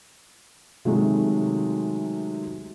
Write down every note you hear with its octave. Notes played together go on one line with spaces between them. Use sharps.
C3 D#3 F#3 G#3 A3